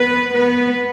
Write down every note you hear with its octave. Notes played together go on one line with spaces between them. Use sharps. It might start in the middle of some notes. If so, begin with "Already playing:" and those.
Already playing: B3 B4
B3 B4